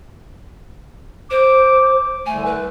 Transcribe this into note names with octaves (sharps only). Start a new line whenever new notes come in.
C5 D6
C2 D3 A3 G#5
B4